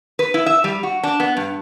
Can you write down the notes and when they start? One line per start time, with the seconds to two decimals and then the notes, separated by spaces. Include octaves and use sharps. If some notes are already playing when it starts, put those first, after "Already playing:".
0.19 B4
0.34 E4
0.46 E5
0.64 G3
0.83 F#4
1.03 D4
1.20 B3
1.37 G2